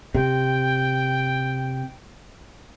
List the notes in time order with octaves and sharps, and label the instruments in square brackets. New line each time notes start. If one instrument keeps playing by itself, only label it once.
[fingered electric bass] C3 [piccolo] G5